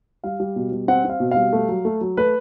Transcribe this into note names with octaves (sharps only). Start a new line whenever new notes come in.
G3 F5
G3
B2
G3
C4 F#5
C4 F5
B2
G3 F5
A3
F#3
A3
F#3
A3 B4